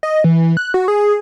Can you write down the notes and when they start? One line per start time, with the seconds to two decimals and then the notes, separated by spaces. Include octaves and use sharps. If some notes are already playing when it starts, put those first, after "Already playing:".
0.03 D#5
0.24 E3
0.57 F#6
0.74 F#4
0.88 G#4